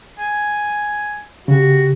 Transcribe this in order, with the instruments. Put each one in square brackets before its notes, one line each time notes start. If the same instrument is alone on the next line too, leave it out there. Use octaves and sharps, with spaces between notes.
[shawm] G#5
[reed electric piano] C#3 [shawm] F#4 [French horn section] G4